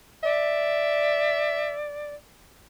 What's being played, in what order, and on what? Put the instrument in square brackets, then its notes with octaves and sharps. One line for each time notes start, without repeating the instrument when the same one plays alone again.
[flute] D5 [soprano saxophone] E5